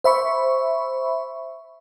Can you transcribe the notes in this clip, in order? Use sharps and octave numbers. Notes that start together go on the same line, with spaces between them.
C5 E5 B5 C#6